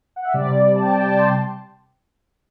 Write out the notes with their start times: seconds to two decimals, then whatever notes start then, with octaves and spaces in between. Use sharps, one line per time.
0.16 F#5
0.25 E5
0.34 C3 G3 D5
0.76 A5
0.82 G5
1.01 G5
1.05 A5
1.18 C6